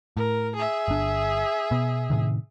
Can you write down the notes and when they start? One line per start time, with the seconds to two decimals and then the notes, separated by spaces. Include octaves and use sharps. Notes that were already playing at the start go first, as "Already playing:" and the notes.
0.17 A2 A#4
0.55 G#4 E5
0.88 G1 D4
1.71 B2 B3
2.10 A2 C3 D#3